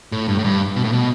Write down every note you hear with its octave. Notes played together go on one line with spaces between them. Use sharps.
A2
G2
A2
G2
B2
A2
B2